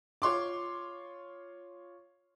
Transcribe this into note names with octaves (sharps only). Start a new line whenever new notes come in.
F4 C#5 C6 D6